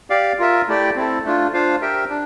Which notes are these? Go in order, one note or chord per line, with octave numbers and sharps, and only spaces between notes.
G4 D5 F5
F4 A#4 E5
A3 E4 G4 D5 G5
C4 E4 A4
A3 D4 F4
D4 F4 C5 F5
G4 A#4 E5 G5
D4